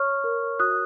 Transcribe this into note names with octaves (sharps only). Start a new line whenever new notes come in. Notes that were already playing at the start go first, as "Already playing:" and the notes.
Already playing: C#5 C#6 F6
A#4
F#4 D#6 F#6